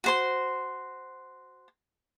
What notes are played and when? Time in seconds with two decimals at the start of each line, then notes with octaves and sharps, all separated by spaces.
0.04 F#4 C5 C6